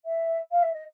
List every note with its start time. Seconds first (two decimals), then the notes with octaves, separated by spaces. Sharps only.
0.05 E5
0.51 F5
0.62 E5
0.73 D#5